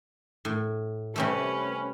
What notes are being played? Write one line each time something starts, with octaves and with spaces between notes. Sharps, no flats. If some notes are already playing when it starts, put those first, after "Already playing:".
A2
C3 G3 A3 C#4 B4